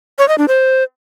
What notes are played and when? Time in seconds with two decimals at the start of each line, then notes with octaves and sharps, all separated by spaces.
0.19 C#5
0.28 D#5
0.38 D4
0.48 C5